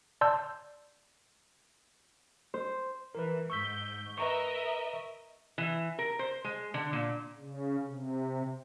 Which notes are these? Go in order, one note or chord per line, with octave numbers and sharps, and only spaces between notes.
D5 A5 C6 E6 G6
C5
E3 A#4 B4
G#2 C#6 E6 G6 B6
A#4 B4 D#5 E5 A#5 C#6
E3
A#4
C5
G#3
D3
A#2
C#3
C3